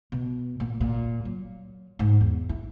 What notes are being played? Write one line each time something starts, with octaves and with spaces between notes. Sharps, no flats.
B2
A#2
A#2
F#3
G#2
E2
E4